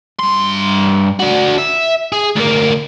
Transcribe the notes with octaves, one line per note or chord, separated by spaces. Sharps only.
G2 C6
D4 F#4
E5
G#4
D2 A#3